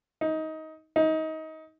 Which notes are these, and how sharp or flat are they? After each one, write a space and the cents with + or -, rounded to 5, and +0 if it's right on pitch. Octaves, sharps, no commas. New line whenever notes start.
D#4 +20
D#4 +25